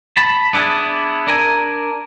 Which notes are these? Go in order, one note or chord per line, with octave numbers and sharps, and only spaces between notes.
A5 B5
B3 D4 E4 G#4
D4 A#4 G#5